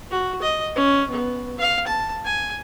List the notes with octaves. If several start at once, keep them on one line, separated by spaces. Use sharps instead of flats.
F#4
D#5
C#4
B3
F5
A5
G#5